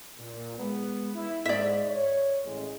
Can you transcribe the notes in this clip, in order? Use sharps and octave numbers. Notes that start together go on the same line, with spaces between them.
A#2
G#3 B3
E4
G#2 D5 E5
C#5
A1 G#3